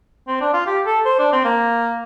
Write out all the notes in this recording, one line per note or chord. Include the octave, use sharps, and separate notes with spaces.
C4
D4
F4
G4
A4
C5
D4
C4
A#3